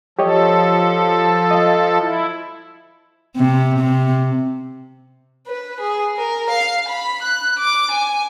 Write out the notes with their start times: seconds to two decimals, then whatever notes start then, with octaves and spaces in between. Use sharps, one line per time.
0.19 F3 G4 A4 C#5 D#5
1.51 D#5 F5
1.99 E4
3.36 C3
3.79 C3
5.47 B4
5.80 G#4
6.17 A#4
6.50 F5
6.89 B5
7.22 F#6
7.59 D6
7.91 G#5